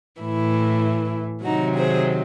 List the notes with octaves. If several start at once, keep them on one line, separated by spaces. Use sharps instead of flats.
A2 E3 E4
C3 D#3 F#3 D#4 F#4
G#4 C5